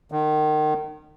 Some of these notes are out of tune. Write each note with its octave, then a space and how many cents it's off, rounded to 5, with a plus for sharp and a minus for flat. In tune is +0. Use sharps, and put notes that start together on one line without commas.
D#3 -30